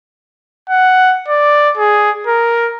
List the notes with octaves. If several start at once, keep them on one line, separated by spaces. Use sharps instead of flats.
F#5
D5
G#4
A#4